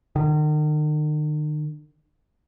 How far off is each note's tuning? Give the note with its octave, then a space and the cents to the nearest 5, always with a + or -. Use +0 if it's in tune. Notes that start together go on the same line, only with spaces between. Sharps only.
D#3 -45